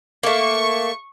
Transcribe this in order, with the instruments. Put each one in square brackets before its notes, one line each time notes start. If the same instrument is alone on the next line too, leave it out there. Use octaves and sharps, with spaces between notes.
[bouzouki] A3 A#3 [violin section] C#6